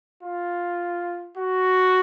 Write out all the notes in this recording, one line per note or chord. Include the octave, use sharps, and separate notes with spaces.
F4
F#4